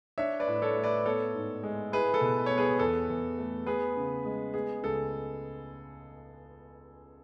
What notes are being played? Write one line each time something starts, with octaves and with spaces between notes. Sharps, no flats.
D4 C#5 E5
B4 D5
A2
A4 C#5
A3
B4 D5
B3 A4 C#5
G#2
G#3
E4 G#4 B4
A4
B2
B3 C#5
G#4 B4
E2 A4
E2
A3
B3 G#4 B4
C#3
G#3
B3 G#4
C#2 A4